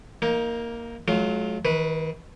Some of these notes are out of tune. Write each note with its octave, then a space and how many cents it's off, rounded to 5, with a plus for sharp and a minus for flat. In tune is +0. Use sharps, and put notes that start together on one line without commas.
A#3 +0 D#4 +25
F#3 +0 A3 -45 F4 +0
D#3 +35 B4 +0